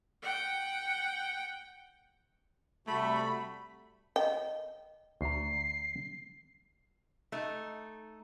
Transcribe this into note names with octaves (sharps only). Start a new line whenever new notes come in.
F#5 G5
C3 G3 A3 F#4 B5
D#5 G5
D2 A#5 C7
A3 D#4